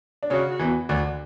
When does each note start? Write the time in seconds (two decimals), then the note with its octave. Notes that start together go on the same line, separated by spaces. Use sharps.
0.23 D4
0.30 C#3 C#4 F#4
0.59 E2 E3
0.89 D2 D3